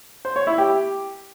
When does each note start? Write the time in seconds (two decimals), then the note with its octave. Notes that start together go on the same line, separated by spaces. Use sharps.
0.25 C5
0.36 C#5
0.47 E4
0.58 G4